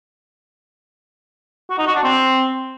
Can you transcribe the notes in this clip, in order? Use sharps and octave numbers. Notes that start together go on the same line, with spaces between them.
F#4
D#4
F#4
D4
C4